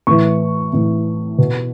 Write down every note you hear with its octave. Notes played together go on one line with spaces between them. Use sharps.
A2 E3 C#6
A2 E3
B2